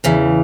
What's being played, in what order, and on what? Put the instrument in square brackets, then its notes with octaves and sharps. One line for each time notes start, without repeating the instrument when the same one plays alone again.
[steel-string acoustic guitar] E2 C#3 E3